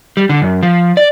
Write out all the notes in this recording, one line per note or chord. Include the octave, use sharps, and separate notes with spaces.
G3
D3
F#2
F3
D5